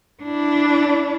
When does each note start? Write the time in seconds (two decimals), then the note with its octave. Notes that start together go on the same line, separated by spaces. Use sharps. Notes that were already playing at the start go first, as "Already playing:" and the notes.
0.23 D4 E4